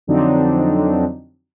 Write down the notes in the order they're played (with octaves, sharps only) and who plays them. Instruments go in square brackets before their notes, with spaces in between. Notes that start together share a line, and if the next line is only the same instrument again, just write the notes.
[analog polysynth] F2 D3 F#3 C4 D4 D#4